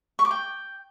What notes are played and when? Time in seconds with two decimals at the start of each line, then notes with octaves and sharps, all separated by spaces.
0.19 C#6
0.25 D6
0.31 G5